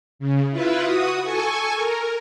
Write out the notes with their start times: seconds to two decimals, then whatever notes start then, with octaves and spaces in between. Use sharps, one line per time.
0.19 C#3
0.51 E4 F4 B4
0.83 F#4 D#6
1.23 A4 G#5 C#6
1.74 A#4